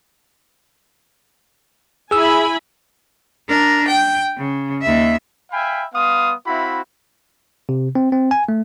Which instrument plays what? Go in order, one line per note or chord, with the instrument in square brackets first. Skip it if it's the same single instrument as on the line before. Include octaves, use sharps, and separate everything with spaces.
[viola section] E4 G#5 B5 [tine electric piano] G#4 E6
[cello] D4 A#4
G5
C#3
D#2 E5
[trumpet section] E5 F5 G5 G#5 B5
G3 B3 F5 C6 D#6
C4 E4 F#4 E5 F5 B5
[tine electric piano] C3
C4
C4
G#5
A3